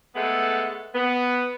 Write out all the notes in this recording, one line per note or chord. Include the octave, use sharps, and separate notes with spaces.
G#3 A3 B3 A4 F#5
B3